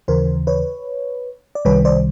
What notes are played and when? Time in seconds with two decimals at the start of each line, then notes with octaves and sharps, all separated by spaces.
0.08 D#2 C#3 E3 A#4 C5
0.47 B4 C#5
1.55 D5
1.65 C2 C3 D#3 G3 B4 C#5
1.85 C5 D5